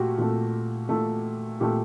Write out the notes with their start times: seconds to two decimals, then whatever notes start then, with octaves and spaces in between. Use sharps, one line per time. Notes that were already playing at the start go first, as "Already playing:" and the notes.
Already playing: A#2 A3 F#4 G4
0.18 A#2 A3
0.89 A#2 A3
1.60 A#2 A3 G4